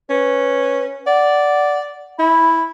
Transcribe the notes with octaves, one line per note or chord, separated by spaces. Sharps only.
C#4 B4
D5 F#5
E4 B5